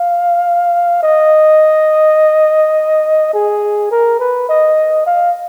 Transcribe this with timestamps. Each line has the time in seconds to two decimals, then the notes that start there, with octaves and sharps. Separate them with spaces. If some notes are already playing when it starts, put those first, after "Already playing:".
Already playing: F5
1.03 D#5
3.34 G#4
3.91 A#4
4.19 B4
4.49 D#5
5.07 F5